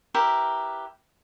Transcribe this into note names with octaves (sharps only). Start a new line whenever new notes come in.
E4 G4 A#4 B4